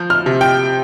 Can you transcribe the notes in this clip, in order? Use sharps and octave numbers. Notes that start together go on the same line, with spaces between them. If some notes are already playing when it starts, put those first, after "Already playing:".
Already playing: F3 G6
F6
C3
G5